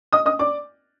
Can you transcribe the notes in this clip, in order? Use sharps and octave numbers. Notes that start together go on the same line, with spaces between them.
D#5 D#6
D#5 D#6
D5 D6